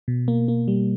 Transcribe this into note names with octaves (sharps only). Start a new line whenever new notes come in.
B2
A#3
A#3
G3